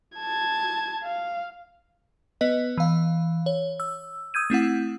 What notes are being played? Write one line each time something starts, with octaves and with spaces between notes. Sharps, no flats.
A5 G#6
F5
B3 B4 D#5
E3 F5
C#5
E6
D#6 E6 G6 G#6 D#7
A3 C4 E4 F#5